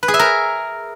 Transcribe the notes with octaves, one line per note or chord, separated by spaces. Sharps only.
B4
G#4
E5
A#4